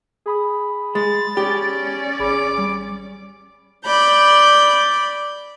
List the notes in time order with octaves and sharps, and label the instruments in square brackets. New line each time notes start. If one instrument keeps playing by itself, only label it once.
[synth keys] G#4 B5 D#6
[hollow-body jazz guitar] G#3 [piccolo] A6
[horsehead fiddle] C#4 D5 [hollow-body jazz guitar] G4
[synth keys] G#1 G#4 B5 [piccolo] D6
[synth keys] G3
[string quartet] D5 B5 G6